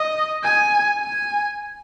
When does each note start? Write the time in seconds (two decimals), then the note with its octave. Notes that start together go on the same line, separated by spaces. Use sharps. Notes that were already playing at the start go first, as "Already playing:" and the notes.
Already playing: D#5
0.43 G#5
1.00 G#5